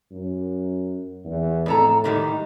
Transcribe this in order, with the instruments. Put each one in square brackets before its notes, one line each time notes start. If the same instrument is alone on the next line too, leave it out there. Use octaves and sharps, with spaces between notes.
[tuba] F#2
E2
[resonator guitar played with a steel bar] F2 A4 A#5 [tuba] A2
[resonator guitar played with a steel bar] G#2 D#3 G3